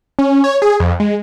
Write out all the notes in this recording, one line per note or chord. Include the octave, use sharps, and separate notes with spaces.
C#4
C#5
G#4
F2
G#3